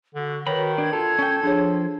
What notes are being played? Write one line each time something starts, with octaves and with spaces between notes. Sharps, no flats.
D3 F#4
D#3 B4 C#5 A#5 B5
D4 G#6
F4 A4
C#4 G5 C#6
F3 D4 G#4 C#5